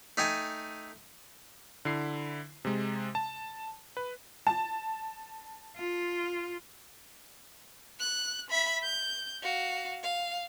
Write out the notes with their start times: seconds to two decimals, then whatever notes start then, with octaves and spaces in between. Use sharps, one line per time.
0.17 A3 D#4 G5 G#5
1.85 D3 E4 C7
2.65 C3 G#3
3.15 A5
3.97 B4
4.47 A5
5.77 F4
7.99 F#6
8.50 E5 B5
8.83 G6
9.43 F#4 F5
10.03 F5